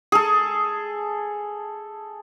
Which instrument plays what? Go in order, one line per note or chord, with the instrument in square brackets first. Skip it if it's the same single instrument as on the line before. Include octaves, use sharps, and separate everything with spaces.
[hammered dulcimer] G#4 A4